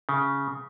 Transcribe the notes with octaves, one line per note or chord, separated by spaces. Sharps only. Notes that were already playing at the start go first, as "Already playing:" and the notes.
C#3